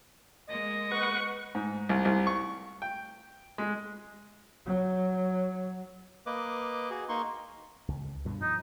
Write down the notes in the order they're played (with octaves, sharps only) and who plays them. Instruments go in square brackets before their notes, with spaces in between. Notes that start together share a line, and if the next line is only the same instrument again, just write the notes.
[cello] G#3 A#3 [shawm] D#5
[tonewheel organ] B4 F#5 [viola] C#6
[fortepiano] G#2
C2
C2
C#6
G5
G#3
[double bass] F#3
[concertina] A#3 B4 D#5 D6
F#4 G#4
A#3 D#4 C6 C#6
[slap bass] C#2
G2 B2 D3
[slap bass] F3 [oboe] D#4